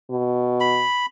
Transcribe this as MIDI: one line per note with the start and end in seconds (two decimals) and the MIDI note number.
0.11 0.84 47
0.60 1.06 83